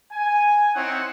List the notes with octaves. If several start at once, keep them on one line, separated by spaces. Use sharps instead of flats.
G#5
C4 D#4 E4 C#5 F#5